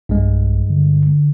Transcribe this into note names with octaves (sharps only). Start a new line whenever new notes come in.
B1 G2 G#3
D3